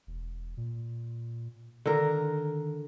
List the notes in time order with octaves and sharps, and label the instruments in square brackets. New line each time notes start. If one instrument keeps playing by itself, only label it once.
[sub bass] E1
A#2
[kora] D3 A#4 [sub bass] D#3